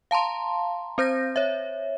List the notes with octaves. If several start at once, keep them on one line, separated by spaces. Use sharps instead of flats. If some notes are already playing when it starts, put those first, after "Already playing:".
F5 A5 A#5 C6
C4 C5 G6 A#6
C#5 E5